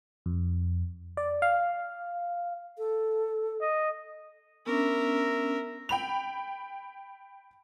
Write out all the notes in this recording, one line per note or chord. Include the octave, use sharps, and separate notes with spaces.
F2
D5
F5
A4
D#5
B3 C#4 D4 A#4 E5
G5 B5 F7